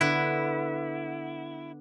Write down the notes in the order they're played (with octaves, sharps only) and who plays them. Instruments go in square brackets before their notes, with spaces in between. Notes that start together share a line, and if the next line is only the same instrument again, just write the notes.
[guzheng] D3 B3 B4 [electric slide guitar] E4